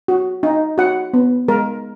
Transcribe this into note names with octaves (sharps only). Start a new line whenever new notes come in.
F#4
D#4
F#4 F#5
B3
G#3 A#4